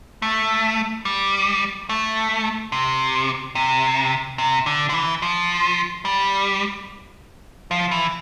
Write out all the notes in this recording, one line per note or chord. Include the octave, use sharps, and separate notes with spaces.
A3
G3
A3
C3
C3
C3
D3
D3
E3
F3
G3
F3
E3